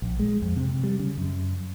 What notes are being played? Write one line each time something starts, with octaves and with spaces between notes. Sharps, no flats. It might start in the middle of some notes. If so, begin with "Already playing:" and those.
A#1
G#3
F2
C3
G3
C#3
F#2